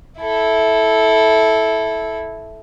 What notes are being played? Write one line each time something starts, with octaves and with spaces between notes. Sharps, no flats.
E4 A4